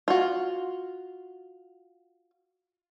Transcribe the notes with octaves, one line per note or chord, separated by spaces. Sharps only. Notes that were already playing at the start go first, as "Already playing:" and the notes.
F4 F#4